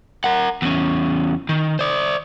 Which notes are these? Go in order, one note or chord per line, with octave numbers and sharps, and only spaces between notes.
A#4 F#5
E2 C#4
D#3
C5 D5